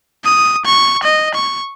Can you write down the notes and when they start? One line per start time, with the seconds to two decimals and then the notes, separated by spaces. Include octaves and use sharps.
0.25 D#6
0.65 C#6
1.03 D#5
1.35 C#6